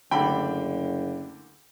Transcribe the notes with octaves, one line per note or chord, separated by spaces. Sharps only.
F#1 D2 D3 G5 B5